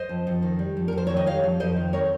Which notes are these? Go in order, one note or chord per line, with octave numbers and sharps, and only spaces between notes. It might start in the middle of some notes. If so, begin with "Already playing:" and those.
Already playing: C5 D#5
F2
F2
D#3
G3
F2
A#4
F2 C5
D#3 C#5
D#5
G3 C#5 F5
F2
F2 C5 D#5
D#3
C4 A#4 C#5